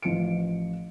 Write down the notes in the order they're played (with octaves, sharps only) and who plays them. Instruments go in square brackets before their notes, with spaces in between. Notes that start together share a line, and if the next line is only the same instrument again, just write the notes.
[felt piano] A1 F3 C#7 D7